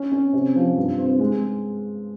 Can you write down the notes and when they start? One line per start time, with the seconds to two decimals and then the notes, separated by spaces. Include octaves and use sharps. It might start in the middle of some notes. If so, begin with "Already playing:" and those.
Already playing: C#4
0.12 C#4
0.33 C3
0.56 F3
0.77 G2
0.98 C4
1.20 G#3